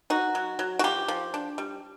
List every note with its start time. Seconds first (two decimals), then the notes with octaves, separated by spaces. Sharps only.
0.10 D#4 F#4
0.35 F#3
0.59 F#3
0.79 F#4
0.84 F3 G4
1.08 F3
1.34 D4
1.58 G3